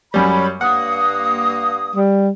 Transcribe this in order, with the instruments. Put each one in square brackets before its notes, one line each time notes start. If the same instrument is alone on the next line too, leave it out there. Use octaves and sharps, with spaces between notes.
[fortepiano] F#2 G3 [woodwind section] C#5 B5
[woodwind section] G2 A#3 D#6 [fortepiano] F#5
[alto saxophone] G3